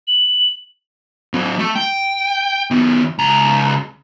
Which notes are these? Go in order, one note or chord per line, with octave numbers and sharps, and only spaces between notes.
F#7
F#3 C4
A3
G5
D#3 B3
C#2 A#5